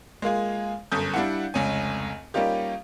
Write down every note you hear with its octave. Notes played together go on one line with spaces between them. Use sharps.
G#3 A#3 F4 G#4
G1 F#2 A4 D#6 G6
G3 D4 E4 F5 F#5
F1 C#2 C#4 G#5
G3 A#3 C#4 D#4 F4 G4